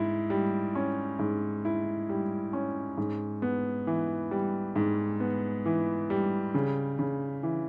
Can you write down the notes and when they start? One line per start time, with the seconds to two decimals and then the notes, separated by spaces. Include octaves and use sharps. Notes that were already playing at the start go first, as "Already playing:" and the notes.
Already playing: G#2 E4
0.30 G3
0.75 C#4
1.19 G#2
1.65 E4
2.09 G3
2.53 C#4
2.97 G#2
3.42 B3
3.87 E3
4.31 G3
4.76 G#2
5.20 B3
5.66 E3
6.10 G3
6.54 C#3
6.99 C#3
7.43 E3